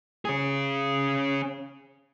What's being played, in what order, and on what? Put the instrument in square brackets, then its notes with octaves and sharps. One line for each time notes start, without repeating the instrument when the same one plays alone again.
[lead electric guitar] C#4 G#4